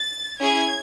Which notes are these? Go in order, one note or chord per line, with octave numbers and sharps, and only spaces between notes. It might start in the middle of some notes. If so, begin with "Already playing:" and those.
Already playing: A6
C#4 E4 G#4 G#6